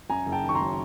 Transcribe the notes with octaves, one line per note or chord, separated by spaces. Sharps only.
F#2 G#5 A#5
F#1
G5 A5
D#3
C#6
A#5 C6
F#3